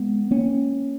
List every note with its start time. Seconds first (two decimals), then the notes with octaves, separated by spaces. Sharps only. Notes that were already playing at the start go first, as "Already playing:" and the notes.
Already playing: G#3 B3
0.31 A#3 C#4